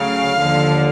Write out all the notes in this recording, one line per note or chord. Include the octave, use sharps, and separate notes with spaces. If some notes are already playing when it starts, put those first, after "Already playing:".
Already playing: D2 C#3 F#3 F5
D#2 D3 F3